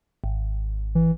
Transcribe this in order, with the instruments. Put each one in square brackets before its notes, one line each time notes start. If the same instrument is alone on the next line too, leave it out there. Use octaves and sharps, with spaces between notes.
[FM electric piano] G#1
[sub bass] E3